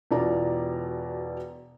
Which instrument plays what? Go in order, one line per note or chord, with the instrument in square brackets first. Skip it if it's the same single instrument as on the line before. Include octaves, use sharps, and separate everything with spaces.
[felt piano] E1 B2 E3 F4 D5 A#5